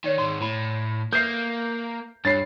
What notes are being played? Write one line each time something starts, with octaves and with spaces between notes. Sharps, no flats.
D#3 C#5 D5 G5
G#2 D#3 C6
A2 E4 B5
A#3 A4 B4 E5 G6 C7
G2 D4 C#5 B5 A6 C7